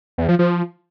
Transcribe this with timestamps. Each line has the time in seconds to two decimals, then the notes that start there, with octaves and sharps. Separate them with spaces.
0.18 E2
0.28 F3
0.39 F3